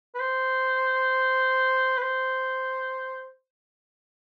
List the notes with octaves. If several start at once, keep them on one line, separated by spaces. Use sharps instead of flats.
B4
C5
B4
C5